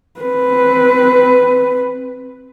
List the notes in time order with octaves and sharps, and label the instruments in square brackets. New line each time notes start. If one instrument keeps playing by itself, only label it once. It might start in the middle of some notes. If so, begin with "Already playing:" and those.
[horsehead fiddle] C4 B4